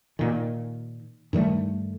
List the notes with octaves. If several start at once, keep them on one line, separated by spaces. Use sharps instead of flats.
A#2 D#3
G2 D#3 G3 A3